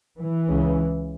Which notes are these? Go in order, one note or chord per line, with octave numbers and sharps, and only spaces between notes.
E3
C#2 C#3